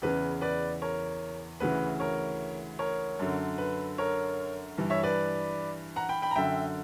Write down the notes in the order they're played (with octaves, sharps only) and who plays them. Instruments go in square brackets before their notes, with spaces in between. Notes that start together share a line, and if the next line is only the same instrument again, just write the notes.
[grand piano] E2 C#3 E3 B4
B4 D5
A#4 C#5
D2 C#3 E3 B4
A#4 C#5
A#4 C#5
F#2 D3
B4
A#4 C#5
G2 E3
C#5 E5
B4 D5
F#5 A#5
G5 B5
G5 B5
A#5
F#2 D3 E5 G5